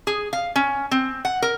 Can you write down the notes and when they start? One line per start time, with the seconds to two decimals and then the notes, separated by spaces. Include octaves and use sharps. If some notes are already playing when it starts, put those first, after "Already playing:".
0.07 G#4
0.33 F5
0.56 C#4
0.91 C4
1.25 F#5
1.42 A#4